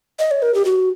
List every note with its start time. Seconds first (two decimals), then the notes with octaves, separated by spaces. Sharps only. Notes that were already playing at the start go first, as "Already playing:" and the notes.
0.19 D#5
0.31 C#5
0.42 A#4
0.54 G4
0.65 F#4